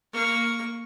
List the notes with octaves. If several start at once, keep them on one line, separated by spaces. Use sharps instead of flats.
A#3 C#6